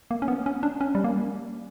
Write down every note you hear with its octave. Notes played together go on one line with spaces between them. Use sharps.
A#3
C#4
B3
C#4
D4
C#4
G3
A#3